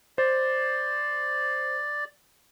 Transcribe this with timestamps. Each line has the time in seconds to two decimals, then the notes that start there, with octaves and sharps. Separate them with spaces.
0.18 C5 D5